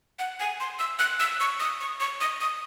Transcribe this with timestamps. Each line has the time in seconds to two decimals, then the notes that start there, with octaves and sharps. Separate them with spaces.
0.19 F#5
0.40 G#5
0.60 C6
0.79 E6
0.99 F#6
1.20 E6
1.40 C#6
1.60 D#6
1.81 C#6
2.00 C#6
2.21 D#6
2.41 D#6